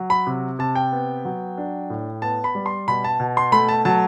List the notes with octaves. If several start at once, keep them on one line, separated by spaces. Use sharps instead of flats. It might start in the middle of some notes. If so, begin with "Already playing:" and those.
Already playing: F#3
B5
C3
C3 A5
G5
B3
F#3
D4
A2
B3 A5
B5
G3
C6
B2 B5
A5
B2
C6
A3 B5
A5
F#3 A5